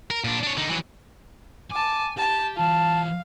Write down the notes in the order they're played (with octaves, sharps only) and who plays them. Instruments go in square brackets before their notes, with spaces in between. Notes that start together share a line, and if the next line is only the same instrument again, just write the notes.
[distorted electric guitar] A#4
A#2 D4
D4 C#5
D3 D#4
E3 F#3
[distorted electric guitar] G#5 [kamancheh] A5 D6
[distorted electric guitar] G4 [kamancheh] A5
[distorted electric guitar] E3 F4 [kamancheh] F5 [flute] A5